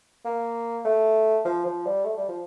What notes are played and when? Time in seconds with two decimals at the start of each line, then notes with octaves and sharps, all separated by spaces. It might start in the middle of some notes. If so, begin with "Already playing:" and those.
0.25 A#3
0.85 A3
1.45 F3
1.65 F3
1.86 G3
2.05 A3
2.17 G3
2.28 F3